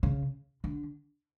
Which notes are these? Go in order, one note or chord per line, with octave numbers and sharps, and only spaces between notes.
C#3
D3